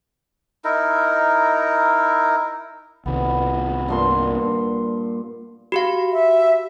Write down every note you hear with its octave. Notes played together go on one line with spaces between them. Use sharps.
D#4 E4 A#4
C2 D#3 B3
G2 A#2 C6
F#4 G4 F5
E5